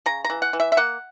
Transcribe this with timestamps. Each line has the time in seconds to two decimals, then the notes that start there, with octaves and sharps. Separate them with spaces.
0.06 C#3 A#5
0.25 A#5
0.30 E3
0.42 F#5
0.53 E3
0.60 E5
0.72 E5
0.77 A#3 F#5